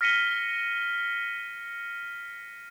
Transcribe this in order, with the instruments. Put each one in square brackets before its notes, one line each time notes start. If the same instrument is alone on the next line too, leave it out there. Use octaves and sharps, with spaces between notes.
[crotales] F6 A#6 B6 C#7 D#7 G7